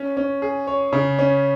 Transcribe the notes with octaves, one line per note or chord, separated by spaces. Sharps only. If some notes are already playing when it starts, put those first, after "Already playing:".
Already playing: C#4
C#4
G#4
C#5
C#3
C#4